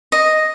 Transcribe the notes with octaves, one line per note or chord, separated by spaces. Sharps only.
D#5